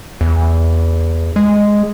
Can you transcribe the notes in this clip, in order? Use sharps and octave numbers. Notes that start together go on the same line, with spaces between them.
E2
G#3